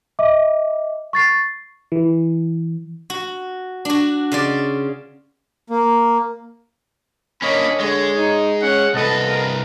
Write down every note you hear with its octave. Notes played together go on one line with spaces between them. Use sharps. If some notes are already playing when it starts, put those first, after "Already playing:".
D#5 E5 D6
C#6 A6 C7
E3
F#4
D4 F#4
C#3 F4 D5
A#3
A#3 C#4 D4 C#5 D#5 B5
D3 G#3 C#5
D#4
C#4 F#5
C2 B3 A4 B4 D#5 A5
A#4